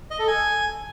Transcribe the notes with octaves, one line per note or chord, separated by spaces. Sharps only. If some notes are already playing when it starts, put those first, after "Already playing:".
D#5
A4
G#5